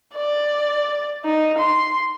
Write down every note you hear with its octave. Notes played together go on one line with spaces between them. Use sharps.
D5
D#4
C6